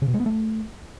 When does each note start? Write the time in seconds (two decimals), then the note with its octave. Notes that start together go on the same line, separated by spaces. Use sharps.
0.02 C#3
0.08 B2
0.14 G#3
0.20 B3
0.26 A3